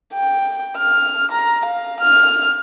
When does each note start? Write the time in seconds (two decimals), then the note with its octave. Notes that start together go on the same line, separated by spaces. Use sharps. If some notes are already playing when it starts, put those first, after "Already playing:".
0.14 G5
0.77 F6
1.32 A#5
1.66 F5
2.01 F6